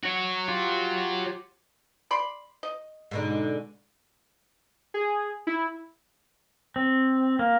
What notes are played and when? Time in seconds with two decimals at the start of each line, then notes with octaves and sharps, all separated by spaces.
0.04 F#4 C#5
0.48 F4 G4
2.11 D5 B5 C6
2.63 D#5
3.11 G#2 B2 D3
4.94 G#4
5.47 E4
6.76 C4
7.39 A#3